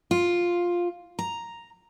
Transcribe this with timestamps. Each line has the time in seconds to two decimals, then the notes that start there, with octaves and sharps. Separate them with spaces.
0.11 F4
1.19 A#5